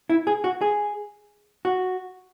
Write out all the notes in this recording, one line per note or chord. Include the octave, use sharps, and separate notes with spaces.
E4
G#4
F#4
G#4
F#4